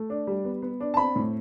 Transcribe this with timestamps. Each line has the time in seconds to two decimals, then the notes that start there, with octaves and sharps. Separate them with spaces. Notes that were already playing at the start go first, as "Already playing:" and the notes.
Already playing: A3
0.10 D4
0.27 G3
0.45 B3
0.62 B3
0.80 D4
0.94 A5
0.97 C4 B5
1.16 A2